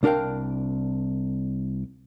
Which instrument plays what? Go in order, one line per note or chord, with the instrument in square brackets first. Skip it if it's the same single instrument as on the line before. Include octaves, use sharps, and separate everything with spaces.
[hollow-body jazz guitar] C2 D4 A#4 F5 G5